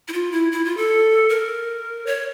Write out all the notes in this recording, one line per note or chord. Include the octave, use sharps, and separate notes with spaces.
E4
F4
E4
E4
F4
A4
A#4
C#5